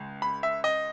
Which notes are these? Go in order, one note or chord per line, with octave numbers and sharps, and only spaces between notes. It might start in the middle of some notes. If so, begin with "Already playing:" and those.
Already playing: C#2 G#3
B5
E5
D#5